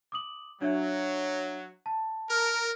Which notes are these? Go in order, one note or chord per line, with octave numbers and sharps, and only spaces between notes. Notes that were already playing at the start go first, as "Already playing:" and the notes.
D6 D#6 F#7
F#3 D4 C#5 E5
A5
A#4